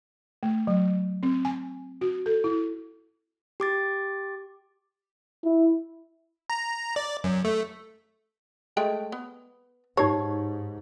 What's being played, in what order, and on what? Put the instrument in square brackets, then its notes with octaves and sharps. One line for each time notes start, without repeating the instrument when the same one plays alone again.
[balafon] A3
F#3
C4
G#5
F#4
A4
E4
[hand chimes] G4 D6 A6
[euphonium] E4
[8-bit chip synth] A#5
D5
F#2
A3
[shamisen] G#3 A3 G5
B3
[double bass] G#2 [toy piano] D#4 G4 C#6 [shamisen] C#5